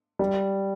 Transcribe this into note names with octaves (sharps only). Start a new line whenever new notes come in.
G3